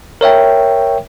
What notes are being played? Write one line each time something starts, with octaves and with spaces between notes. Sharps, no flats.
A#4 C#5 E5 G5